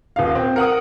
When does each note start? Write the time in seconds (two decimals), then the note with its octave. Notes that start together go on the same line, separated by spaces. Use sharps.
0.16 D#1 F5
0.35 C4
0.56 A#4 F#5 D#6